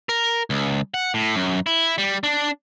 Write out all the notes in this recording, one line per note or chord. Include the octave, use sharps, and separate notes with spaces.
A#4
C#2
F#5
A2
F#2
E4
G3
D4